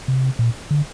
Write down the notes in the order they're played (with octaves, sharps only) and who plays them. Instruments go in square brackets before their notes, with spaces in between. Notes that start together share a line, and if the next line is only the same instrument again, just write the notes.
[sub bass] C3
A#2
D3